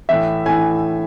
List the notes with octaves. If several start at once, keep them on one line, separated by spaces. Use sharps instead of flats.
A2 E3 E5
A2 E3 G#5